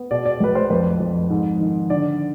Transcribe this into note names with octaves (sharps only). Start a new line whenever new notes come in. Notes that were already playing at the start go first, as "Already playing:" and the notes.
Already playing: B3
B2 D5
D5
B1 B4
C5
F2 B4
F2
G#2
D#3
D3 D5